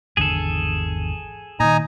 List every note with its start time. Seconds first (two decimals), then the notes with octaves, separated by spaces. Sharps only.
0.17 G#1 E2 D3 G#4 A4
1.60 A#2 D#3 D#4 G#5 A#5